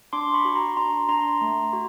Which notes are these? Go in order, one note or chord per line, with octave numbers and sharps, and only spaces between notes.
D4 C6 D6
B5 C#6
F#4
A#5 C6
D4 A#5 C6
D4 A#5 C6
A3
F#4